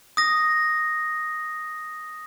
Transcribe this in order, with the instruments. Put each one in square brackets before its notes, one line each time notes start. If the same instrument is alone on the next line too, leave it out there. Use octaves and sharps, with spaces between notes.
[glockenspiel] D#6 A#6